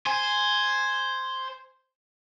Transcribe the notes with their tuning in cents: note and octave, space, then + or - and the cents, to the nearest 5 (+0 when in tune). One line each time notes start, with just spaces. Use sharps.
C5 +0 G#5 +0